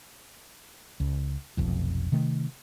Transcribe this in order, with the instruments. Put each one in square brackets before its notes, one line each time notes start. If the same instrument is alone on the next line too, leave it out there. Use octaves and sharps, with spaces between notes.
[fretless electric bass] C#2
F1 B1 F2
C3 D#3 A3